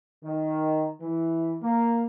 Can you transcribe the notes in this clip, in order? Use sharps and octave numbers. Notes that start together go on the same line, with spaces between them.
D#3
E3
A#3